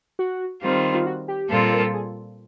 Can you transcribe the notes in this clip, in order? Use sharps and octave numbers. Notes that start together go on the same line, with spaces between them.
F#4
D#3 G3 C4 F4
F4
F#4
G4
A#2 G3 C4 F4 A4
A#4
A4
G#4